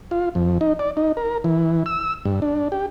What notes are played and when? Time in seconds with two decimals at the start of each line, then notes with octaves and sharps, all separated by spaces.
0.11 F4
0.35 F2
0.61 D#4
0.79 D5
0.97 D#4
1.17 A#4
1.44 E3
1.86 E6
2.25 G2
2.42 D4
2.72 G4